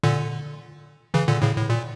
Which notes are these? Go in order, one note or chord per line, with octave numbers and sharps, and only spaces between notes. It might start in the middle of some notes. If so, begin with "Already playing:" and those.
A#2 D3
C#3 E3
A#2 D3
A2 C#3
A2
A#2